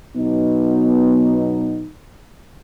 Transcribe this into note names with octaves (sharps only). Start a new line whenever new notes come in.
B2 F#3 B3 D#4